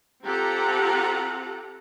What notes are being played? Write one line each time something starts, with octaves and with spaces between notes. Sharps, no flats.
C4 F4 G4 A4 F#5 A#5